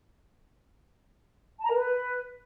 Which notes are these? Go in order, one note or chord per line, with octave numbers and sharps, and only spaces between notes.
A5
A#5
A#4
B4